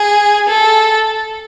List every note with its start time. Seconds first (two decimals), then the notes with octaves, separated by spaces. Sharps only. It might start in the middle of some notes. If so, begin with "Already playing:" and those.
Already playing: G#4
0.49 A4